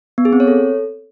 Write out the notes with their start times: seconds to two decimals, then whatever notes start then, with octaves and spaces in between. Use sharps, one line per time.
0.18 B3
0.25 G#4
0.33 C4
0.40 C#5
0.47 A4